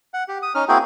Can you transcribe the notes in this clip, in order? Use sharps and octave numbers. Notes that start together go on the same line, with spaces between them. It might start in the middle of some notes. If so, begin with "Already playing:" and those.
F#5
G4
D#6
C#4 D#4 F6
A#3 C4 E4 F#4 G#4 G5